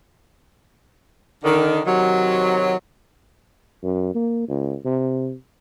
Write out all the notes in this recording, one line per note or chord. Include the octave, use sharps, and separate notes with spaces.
D3 D#3
C3 D#3 F#3
F#2
A#3
C#2
C3